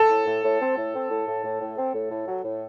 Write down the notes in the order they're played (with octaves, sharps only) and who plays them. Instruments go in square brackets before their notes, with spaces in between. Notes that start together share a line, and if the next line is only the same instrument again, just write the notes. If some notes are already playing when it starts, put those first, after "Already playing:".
Already playing: [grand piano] A4
[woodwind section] A2
A2
A2
C4
A2
C4
A2
A2
A2
A2
C4
A2
A2
F#3
A2